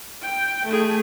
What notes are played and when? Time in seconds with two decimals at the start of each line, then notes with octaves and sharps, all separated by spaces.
0.22 G5
0.66 A3 G#4